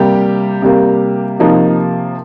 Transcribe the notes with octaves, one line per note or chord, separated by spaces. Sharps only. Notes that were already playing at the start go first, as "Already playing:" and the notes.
Already playing: C3 G3 A#3 G4
C3 G3 A#3
C3 F3 A#3 D#4